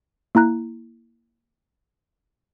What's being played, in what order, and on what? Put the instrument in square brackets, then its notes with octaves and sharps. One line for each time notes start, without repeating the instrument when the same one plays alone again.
[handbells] A#3 E4 A#5 F#6